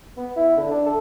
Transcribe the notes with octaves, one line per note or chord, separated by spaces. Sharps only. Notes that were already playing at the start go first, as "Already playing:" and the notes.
B3
E4
D3
D4
A4